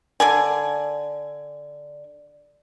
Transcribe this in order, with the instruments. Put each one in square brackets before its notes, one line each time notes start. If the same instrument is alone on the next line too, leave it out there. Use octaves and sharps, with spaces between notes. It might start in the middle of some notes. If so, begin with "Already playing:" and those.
[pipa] D3 D5 G#5